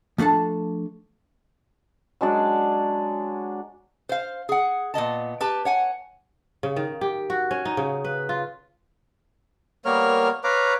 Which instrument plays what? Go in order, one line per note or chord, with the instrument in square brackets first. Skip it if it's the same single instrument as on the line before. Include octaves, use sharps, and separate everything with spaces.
[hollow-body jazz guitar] F3 A3 D4 A4 A5
[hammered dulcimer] F#3 G#3 D4 D5
[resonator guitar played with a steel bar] C5 F5
G#4 F#5
A#2 B3 D#5 A5
G4 B4 A5
C#5 F#5 G#5
[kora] C#3
D#3
G4
F#4
C#4
D#4
C#3
B4
F4
[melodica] G3 B3 A#4 [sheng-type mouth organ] A#3 C#5 F6
[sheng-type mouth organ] B4 C#5 [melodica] F5 A#5 D6